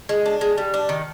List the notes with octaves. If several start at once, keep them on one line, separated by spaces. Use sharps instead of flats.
G#3
D4
G#3
G3
D4
D#3